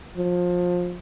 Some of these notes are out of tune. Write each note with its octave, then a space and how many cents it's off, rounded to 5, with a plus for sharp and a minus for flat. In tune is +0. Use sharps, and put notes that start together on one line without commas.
F3 +25